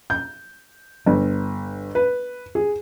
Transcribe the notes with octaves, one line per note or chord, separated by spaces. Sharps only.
G6
G1
B4
G#4